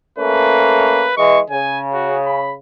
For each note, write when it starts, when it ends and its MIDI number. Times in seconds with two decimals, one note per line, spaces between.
0.18 1.09 57
0.18 1.09 58
0.18 1.09 61
0.18 1.13 71
1.17 1.39 52
1.17 1.39 56
1.17 1.40 85
1.50 2.58 49
1.50 1.80 80
1.93 2.18 66
2.26 2.54 83